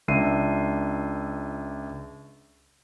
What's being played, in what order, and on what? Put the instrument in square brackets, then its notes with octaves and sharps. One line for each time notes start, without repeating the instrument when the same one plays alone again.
[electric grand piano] C#2 D4 E5 C7 D#7